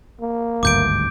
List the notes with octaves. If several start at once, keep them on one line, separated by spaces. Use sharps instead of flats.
A#3
G#1 D2 G2 D6 G6 D7